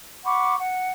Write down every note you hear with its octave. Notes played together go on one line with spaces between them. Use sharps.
F#5 B5 C#6 D6
F#5